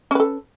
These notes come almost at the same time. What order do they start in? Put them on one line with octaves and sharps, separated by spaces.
C#4 B4 A4